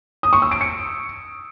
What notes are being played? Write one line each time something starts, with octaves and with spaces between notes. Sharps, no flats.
D#6
C#6
E6
D7
C#7